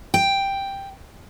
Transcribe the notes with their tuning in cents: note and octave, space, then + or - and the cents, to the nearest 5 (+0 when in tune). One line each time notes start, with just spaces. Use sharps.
G5 +5